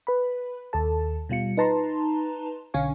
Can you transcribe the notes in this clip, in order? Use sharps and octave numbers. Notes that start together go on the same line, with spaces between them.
B4 B5
D#2 A4 A5
B2 G3 F4 C#7
D#4 B4 A5 A#5 C6
B1 D3 C#4 F5 G#5 C#6